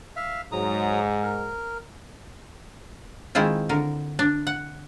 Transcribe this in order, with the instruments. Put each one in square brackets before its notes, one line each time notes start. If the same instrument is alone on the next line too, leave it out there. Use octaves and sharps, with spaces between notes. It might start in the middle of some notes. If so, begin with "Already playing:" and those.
[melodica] E5 F5
[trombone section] G#2 [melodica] F#3 A#5 D#6
[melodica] A#4
[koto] D#3 G#3 C4 E4 F4
D3 A#4
D4
F#5